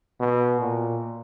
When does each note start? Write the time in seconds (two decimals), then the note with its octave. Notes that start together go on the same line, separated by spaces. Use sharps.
0.20 B2
0.61 A#2